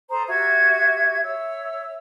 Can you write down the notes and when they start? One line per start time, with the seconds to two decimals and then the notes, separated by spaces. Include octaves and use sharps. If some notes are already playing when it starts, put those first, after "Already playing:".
0.10 A4 C5 A#5 D#6
0.28 F#4 G4 E5 G#6
1.23 C#5 E5 E6